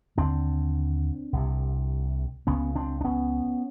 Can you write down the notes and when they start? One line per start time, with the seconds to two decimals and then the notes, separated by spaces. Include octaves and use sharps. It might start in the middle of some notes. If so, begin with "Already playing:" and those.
0.18 D#2 D3 C4 D4
1.33 C2 C3
2.47 C#2 C#3 B3 C#4
2.76 C4 D4
3.01 D4
3.05 B3 C#4